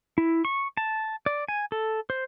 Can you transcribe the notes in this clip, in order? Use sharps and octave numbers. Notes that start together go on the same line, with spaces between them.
E4
C#6
A5
D5
G#5
A4
C5